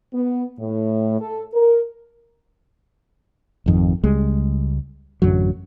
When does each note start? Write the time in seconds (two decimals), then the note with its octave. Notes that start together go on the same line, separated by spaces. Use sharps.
0.14 B3
0.59 A2
1.21 A4
1.53 A#4
3.66 G#1 F2 D#3
4.04 C#2 G3 G#3
5.22 A1 F#2 D3 F#3